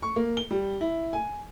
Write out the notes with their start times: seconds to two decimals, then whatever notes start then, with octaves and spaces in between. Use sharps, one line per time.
0.02 C#6
0.16 A#3
0.37 G7
0.51 G3
0.81 E4
1.13 G#5